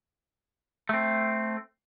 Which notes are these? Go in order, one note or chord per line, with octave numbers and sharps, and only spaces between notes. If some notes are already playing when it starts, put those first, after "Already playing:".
A3 C4